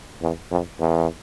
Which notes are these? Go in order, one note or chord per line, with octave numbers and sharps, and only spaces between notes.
E2
F2
E2